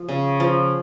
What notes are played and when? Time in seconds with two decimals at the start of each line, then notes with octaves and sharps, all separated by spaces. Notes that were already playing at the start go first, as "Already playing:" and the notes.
Already playing: F3
0.09 C#3
0.40 F3